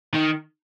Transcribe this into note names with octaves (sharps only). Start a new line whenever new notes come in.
D#3